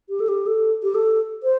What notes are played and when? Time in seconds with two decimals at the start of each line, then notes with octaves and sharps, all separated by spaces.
0.09 G4
0.20 A4
0.28 G4
0.46 A4
0.83 G4
0.95 A4
1.43 C5